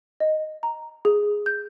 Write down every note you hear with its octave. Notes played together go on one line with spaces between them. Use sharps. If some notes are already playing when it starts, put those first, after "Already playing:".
D#5
A#5
G#4
G6